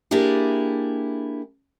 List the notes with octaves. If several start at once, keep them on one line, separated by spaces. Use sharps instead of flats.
A#3 D4 E4 G4 G#4